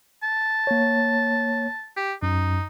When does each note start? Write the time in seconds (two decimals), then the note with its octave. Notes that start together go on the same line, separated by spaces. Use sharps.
0.23 A5
0.67 A#3 C#5
1.97 G4
2.23 F#2 D#4